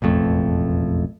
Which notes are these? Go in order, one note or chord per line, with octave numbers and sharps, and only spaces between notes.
E1 A1 F2 A3